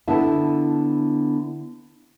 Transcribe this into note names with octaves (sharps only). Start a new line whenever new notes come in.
D3 B3 E4 E5 A5